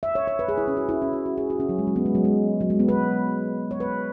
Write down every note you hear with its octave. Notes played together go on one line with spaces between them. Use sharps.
E5
C#5
C#5
B4
G#4
E4
C#4
F#4
E4
C#4
F#4
F#4
G#4
F#4
C#4
F#3
G#3
F#3
B3
G#3
F#3
G#3
F#3
G#3
B3
B4
C#5
B4